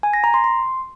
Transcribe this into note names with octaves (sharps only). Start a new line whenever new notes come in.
G#5
A#6
A#5
C6
C6